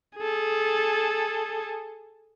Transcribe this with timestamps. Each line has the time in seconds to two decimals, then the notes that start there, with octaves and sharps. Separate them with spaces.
0.18 G#4 A4